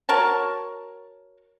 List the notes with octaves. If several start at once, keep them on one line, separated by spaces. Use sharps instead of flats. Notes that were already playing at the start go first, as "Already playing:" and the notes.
F#4 A#4 C#5 A5